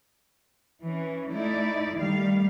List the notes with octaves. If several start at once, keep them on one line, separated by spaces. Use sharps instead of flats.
E3 C#4
A3 D#4 E4 D5
D#3 G3 A3 F5